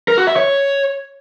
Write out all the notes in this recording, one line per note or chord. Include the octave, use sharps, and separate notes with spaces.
A#4
F#4
E5
C#5